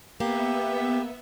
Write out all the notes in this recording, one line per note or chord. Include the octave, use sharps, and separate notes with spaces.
A#3 B3 G4 E5